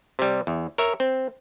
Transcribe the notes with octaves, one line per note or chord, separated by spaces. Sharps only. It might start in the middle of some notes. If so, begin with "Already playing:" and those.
C3 G3
E2
A#4 C#5 E5
C4